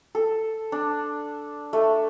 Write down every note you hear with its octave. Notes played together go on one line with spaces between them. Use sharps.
A4
D4
A3